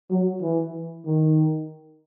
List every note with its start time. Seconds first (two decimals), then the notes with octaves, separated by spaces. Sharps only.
0.11 F#3
0.42 E3
1.06 D#3